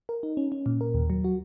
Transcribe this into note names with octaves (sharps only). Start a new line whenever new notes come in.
A#4
D#4
C#4
C#4
A#2
A#4
D#2
F#3
F#4